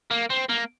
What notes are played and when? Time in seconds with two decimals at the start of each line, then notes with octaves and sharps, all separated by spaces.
0.11 A#3
0.30 C4
0.49 A#3